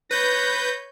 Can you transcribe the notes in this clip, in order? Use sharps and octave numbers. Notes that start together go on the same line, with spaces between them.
B4 C#5 G6 A#6